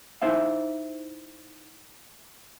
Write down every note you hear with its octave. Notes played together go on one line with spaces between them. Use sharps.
D#4 E4 C5 E5 F5